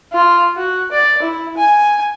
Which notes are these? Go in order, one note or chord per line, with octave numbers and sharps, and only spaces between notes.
F4
F#4
D5
E4
G#5